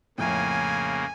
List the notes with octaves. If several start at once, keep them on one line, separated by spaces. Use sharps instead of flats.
F2 A2 C#3 A#3 G#5